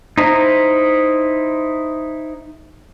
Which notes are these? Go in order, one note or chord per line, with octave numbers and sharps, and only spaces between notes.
D#4 E4 C5 A#5